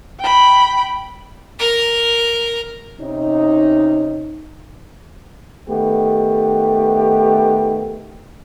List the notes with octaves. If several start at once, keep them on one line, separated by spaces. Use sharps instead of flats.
G5 B5
A#4 A#5
C3 C#4 D#4
D#3 A3 B3 G4